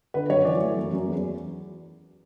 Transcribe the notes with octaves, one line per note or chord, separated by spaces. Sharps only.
D3 B4
F#2 C#5
E3 D5
A3
F#2
F#2
E2